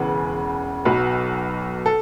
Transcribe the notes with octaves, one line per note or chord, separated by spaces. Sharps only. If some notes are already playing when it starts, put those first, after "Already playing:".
Already playing: E1 E2 C#3 B4
B1 B2 F#3 B4
A4